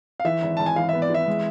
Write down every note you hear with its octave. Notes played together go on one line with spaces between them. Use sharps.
F5
E3 E5
G#1
G#1 A5
G#5
E3 F5
E5
B3
D5
E3 E5
G#3